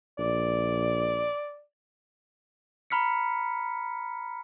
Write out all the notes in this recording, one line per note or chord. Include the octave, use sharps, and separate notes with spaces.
A#1 D5
A#5 B5 F6 B6 C#7